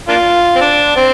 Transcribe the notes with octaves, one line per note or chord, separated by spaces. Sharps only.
A#3 D4 F4
C4
D4
C4